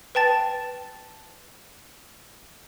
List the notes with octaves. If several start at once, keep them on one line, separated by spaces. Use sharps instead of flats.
B4 G5 A5 A6